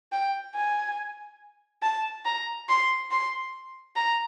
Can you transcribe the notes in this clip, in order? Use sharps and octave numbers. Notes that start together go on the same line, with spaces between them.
G5
G#5
A5
A#5
C6
C6
A#5